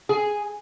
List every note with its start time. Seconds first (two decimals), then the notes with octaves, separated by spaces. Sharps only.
0.09 G#4